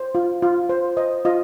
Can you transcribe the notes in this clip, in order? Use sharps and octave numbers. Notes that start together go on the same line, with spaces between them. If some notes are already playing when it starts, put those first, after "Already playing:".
Already playing: C5
F4
F4
C5
C5 D#5
F4 D#5